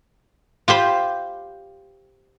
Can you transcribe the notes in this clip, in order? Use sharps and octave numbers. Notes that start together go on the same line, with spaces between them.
F4 G4 C5 B5